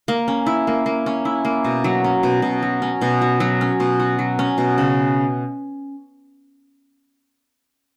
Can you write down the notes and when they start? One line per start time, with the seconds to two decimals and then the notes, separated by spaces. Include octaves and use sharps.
0.08 A#3
0.28 C#4
0.46 E4
0.67 A#3
0.86 A#3
1.06 C#4
1.25 E4
1.45 A#3
1.65 B2
1.84 F#3
2.04 C#4
2.23 B2
2.42 B2
2.62 F#3
2.82 C#4
3.02 B2
3.22 F#4
3.40 F#3
3.61 C#4
3.80 B2
4.00 F#4
4.19 F#3
4.39 C#4
4.58 B2
4.78 C#3